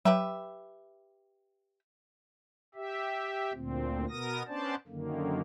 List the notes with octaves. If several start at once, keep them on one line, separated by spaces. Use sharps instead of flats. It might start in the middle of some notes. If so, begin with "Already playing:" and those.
F#3 G4 B4 E5
G4 E5
D2 A#2 C4
B2 B3 A#4 D#6 A#6
B3 C#4 D4 C5 D5 A5
F#2 D3 D#3 A#3